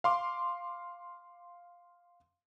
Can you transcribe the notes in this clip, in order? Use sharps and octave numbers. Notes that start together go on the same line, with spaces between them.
F5 C6 D6